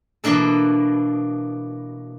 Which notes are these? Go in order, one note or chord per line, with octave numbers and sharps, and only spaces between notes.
B2 E3 A#3 D4 A4